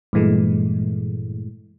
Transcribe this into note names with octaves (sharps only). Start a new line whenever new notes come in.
G2 A#2 E3 G#3 A3